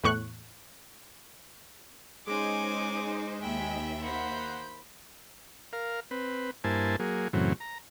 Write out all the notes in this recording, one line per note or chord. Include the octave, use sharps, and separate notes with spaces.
E2 A2 C#6 F#6
G#3 C#4 D#4 G#4 C5 G#5 D6
D#2 E5 G5 G#5 B5
A#3 C5 F#5 B5 G6
A#4 F5
C4 B4
G2 A#3 E4 C5 G#5 A5
F#3 A#3 G#4
F#2 A2 C#3 E3 F#3 C4
A#5